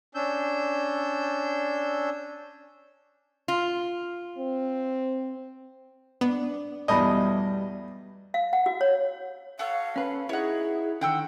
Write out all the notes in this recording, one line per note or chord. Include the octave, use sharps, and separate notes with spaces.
C#4 D4 E6 G6
F4
C4
B3 D4
E2 B2 G3 A3 D5 D#5 A5 B5
F5
F#5
F#4
C#5
F#4 A4 C#5 F5
C#4 B4
D#4 E4 G#4 C#5 F#5
D3 D#3 F#5 G5 E6